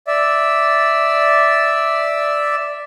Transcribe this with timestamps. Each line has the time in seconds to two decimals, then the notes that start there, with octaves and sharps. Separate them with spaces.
0.07 D5 E5